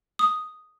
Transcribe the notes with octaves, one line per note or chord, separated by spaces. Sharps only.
D#6